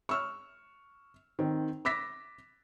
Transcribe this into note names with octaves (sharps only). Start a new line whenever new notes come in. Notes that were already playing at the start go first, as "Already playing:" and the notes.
C#6 E6 F6
D#3 C4
D6 E6 A#6 B6